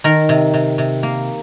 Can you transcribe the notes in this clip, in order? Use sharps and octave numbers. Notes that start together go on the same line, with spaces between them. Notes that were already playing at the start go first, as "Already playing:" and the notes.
D#3 A#4
C3
C3
C3
A#3